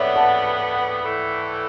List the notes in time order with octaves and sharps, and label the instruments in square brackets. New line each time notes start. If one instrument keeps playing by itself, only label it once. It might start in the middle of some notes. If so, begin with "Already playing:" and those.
Already playing: [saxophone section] A2 E3 B3 [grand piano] C#5 D5 E5 F#5
[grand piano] F#5 A5
[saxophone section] A2 E3 A3 E4